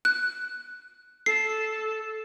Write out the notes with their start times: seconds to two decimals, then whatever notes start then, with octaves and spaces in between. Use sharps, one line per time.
0.05 F#6
1.26 A4 C7